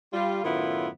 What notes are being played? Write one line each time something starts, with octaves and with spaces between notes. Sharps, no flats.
G3 F4
F#2 A2 D#3 B3 E4 F4